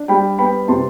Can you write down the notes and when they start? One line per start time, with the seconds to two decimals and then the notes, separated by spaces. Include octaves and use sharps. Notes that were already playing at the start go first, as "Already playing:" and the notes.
Already playing: D4
0.08 G3 G5 B5
0.39 B3 G5 B5
0.68 C3 A5 C6